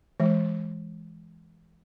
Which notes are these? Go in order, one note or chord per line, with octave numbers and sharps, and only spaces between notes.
E3 G#3